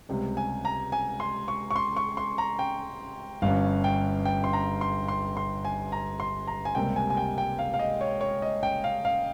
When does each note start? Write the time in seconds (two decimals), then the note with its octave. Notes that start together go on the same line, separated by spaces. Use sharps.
0.09 C#2 C3 G3
0.37 G#5
0.65 A#5
0.92 G#5
1.20 C6
1.48 C#6
1.71 C#6
1.76 C6
1.97 C#6
2.17 C6
2.38 A#5
2.59 G5
3.42 G1 G2 G3 C#4 F5
3.84 G5
4.25 G5
4.44 C6
4.53 A#5
4.81 C6
5.08 C6
5.37 C6
5.65 G#5
5.92 A#5
6.20 C6
6.47 A#5
6.65 G#5
6.75 C#2 C3 G3 A#3 G5
6.96 G#5
7.10 G#5
7.17 G5
7.38 G5
7.59 F5
7.74 F5
7.79 D#5
8.01 C#5
8.21 C#5
8.42 D#5
8.63 G5
8.84 F5
9.05 F5